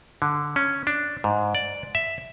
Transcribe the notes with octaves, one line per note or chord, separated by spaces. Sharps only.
D3
C#4
D4
G#2
D5
E5